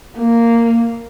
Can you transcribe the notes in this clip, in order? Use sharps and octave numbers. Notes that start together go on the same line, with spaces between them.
A#3